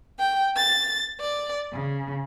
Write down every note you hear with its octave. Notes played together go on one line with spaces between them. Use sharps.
G5
A6
D5
C#3